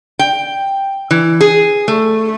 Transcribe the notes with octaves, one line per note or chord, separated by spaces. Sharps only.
G5
E3
G#4
A3